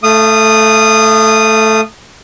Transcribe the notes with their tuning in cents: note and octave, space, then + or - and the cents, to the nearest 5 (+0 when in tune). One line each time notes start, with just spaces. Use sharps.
A3 +0 F5 -40 D#6 -15